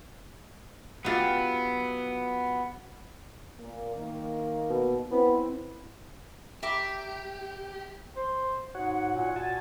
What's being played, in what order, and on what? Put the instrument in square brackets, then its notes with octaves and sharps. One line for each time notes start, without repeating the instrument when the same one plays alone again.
[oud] F#3 F4 G4 [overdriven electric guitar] B3
[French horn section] A#2 A#3
D#3 A#3
[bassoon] B2
[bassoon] B3 [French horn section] C4 E4
[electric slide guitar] G4 [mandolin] E5 A#5 D6
[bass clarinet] C5
[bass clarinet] G#2 [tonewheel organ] F#4 C#5 F#5
[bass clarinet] A#2
[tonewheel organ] F#4 G#5 A5